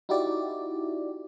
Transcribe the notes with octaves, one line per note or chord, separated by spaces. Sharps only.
D#4 E4 F#4 G4 D5